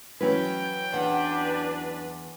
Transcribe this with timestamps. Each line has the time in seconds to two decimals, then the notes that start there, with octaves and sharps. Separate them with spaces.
0.21 E3 F#3 C#4 B4 G5
0.92 E2 D4 B4 F#5